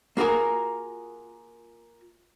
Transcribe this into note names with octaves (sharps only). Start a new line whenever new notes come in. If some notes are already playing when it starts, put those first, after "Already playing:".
A#3 F4 F#4 G#4 A#4